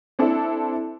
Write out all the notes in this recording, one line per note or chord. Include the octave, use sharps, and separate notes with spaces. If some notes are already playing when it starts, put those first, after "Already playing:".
C4 D4 E4 A4